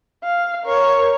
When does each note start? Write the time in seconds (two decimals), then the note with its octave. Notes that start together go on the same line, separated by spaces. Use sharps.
0.24 F5
0.65 A#4 C#5